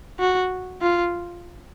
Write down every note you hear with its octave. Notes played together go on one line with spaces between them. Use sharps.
F#4
F4